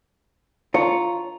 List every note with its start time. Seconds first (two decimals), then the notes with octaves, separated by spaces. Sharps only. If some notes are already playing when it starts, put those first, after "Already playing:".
0.74 F4 C#5 A#5